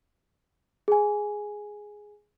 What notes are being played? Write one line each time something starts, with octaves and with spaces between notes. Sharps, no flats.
G#4 G#5